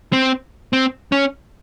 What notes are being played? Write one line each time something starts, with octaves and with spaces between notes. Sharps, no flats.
C4
C4
C#4